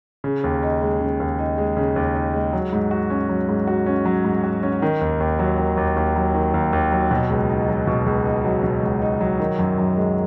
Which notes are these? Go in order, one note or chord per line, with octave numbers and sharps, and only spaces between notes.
C#3
D#2
D#4
G#3
C#3
D#2
D#4
G#3
C#3
D#2
D#4
G#3
F#3
G#2
F#4
C#4
F#3
G#2
F#4
C#4
F#3
G#2
F#4
C#4
D#3
D#2
D#2
F#3
D#3
D#2
D#2
F#3
D#3
D#2
D#2
F#3
B2
C#2
D#4
F#3
B2
C#2
D#4
F#3
B2
C#2
D#4
F#3
D#3
F#2
F#2
G#3